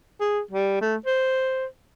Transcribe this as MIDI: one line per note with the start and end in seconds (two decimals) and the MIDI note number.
0.20 0.41 68
0.51 0.77 55
0.81 0.96 57
1.06 1.65 72